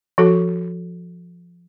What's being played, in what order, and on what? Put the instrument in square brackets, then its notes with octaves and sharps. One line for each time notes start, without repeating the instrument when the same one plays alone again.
[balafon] F3 F#4 A4 C#6